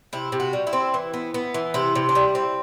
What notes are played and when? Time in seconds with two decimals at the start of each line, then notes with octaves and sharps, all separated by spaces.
0.13 C3 E4
0.32 C3
0.40 F#4
0.53 G3
0.67 E4
0.73 C4
0.94 E3
1.14 B3
1.34 B3
1.54 E3
1.74 C3 E4
1.95 C3
2.09 D4
2.15 G3 E4
2.35 C4